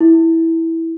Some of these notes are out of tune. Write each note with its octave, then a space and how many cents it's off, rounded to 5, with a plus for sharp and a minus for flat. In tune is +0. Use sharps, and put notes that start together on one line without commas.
E4 -10